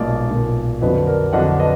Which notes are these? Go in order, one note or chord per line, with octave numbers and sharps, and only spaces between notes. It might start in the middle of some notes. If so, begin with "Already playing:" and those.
Already playing: B1 A#2 G#3 D5 F5
B1 A#2 G#3
F2 D3 F#3 D4 B4 D#5
A#4 D5
F2 D3 F#3 D4 D#5 F#5
B4 D#5